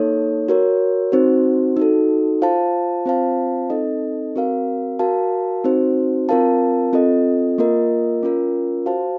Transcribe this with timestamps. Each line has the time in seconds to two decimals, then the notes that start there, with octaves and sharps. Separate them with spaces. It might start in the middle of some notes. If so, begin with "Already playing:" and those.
Already playing: A#3 D#4 A4 C#5
0.48 F#4 A#4 C#5
1.12 C4 D#4 F#4 C5
1.77 D#4 F#4 A4
2.42 F4 C5 F5 A5
3.06 C4 F4 C5 F5 A5
3.70 C4 D#4 A4 D#5
4.36 C4 F#4 A#4 F5
4.99 F#4 A#4 F5 A5
5.64 C4 D#4 F#4 C5
6.29 C4 F4 A#4 F5 A5
6.93 C4 F4 A4 D#5
7.58 A#3 F4 A#4 D#5
8.23 C#4 F4 A#4
8.86 F#4 C5 F5 A5